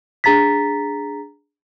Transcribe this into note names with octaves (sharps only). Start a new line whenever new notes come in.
D4 G#4 A#5 A6 B6